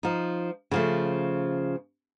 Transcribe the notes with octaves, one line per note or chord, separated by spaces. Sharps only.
F3 D#4
C#3 F3 A3